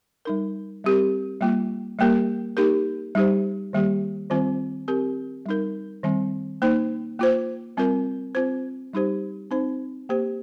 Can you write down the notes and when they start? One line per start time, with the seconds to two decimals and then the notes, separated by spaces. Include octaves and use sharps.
0.25 G3 D#4 A#4
0.84 G3 C4 G4 A#4
1.41 G3 A#3 F4
1.99 G3 A#3 G4 A#4
2.57 A#3 D#4 G4 A#4
3.15 G3 D#4 G4 C5
3.73 D#3 G3 A#3 G4
4.30 D#3 G3 C4 F4 C5
4.88 C4 G4 A#4
5.46 G3 D#4 A#4
6.03 D#3 G3 C4
6.62 A#3 D#4 C5
7.19 A#3 F4 C5
7.77 G3 C4 F4 A#4
8.35 C4 F4 C5
8.93 G3 D#4 G4 C5
9.51 C4 D#4 C5
10.09 A#3 G4 C5